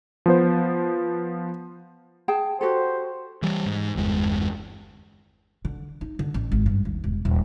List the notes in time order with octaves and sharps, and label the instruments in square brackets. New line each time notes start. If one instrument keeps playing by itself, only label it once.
[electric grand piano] F3 B3 C5
[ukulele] G#4 G5 A5
[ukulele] F#4 G4 A4 [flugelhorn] C5
[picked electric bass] E3 G3
G#2
G1 E2 G#3
[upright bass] D3
D#4
D3
A1
G#1
G2
D#2
E1
D#1